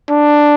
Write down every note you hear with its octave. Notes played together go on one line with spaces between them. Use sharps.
D4